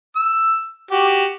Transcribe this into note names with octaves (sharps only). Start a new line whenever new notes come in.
E6
F#4 G4